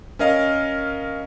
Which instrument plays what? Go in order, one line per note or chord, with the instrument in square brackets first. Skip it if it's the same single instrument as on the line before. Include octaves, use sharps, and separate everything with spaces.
[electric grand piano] C#4 A#4 D#5 F5